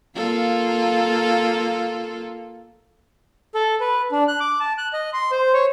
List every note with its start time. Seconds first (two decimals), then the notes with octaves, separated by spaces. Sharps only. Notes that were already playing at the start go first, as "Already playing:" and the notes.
0.16 A#3 F4 A4
3.55 A4
3.80 B4
4.12 D4
4.28 F#6
4.40 D6
4.60 A5
4.78 F#6
4.93 D#5
5.13 C6
5.32 C5
5.54 C#5